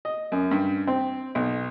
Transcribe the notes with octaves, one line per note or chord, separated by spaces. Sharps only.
D#5
F#2
G2
C4
B1